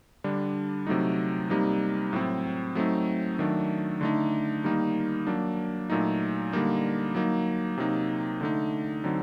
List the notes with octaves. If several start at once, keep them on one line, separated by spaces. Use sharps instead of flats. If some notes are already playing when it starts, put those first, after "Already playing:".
D3 G3 D4
C3 F#3 A3 D#4
C3 G3 A#3 D#4
A2 F#3 C4
F#3 A3 C4 D#4
D#3 F#3 A3 D4
D3 A3 D#4
D#3 G3 A#3 D#4
F#3 A#3 D4
A#2 F#3 A3 D#4
D3 G3 A#3 D#4
F#3 A#3 D#4
C3 F#3 A#3 D#4
D3 A3 D#4
D3 F#3 C4 D#4